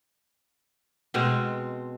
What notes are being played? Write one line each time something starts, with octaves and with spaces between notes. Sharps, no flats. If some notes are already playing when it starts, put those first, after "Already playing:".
B2 G#3 C4